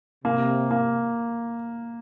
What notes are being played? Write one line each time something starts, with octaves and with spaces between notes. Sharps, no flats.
C3 A#3
A#3